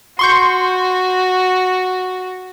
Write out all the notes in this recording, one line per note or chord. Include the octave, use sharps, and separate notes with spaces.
F#4 C6 C#6 G6